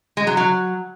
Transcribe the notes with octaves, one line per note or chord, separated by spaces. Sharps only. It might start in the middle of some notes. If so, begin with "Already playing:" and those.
G#3
F#3
F#3